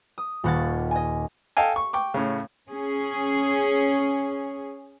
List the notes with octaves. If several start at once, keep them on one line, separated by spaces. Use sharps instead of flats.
D#6
D#1 D#2 F#5 G#6 A6
D#5 G#5
A4 D#5 F5 G5 G#5
C#6
G5 C#6 D6
A2 C#3
C#4 G#4